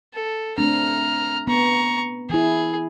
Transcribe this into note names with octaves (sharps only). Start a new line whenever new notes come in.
A4
A3 C4 D4 A#5 F6
B3 A#5 C#6
E3 E4 G#4